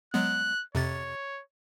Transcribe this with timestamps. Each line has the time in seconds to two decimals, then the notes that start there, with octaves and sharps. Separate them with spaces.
0.14 F#3 G#3 B3 F#6
0.75 F2 C3 C#5 A6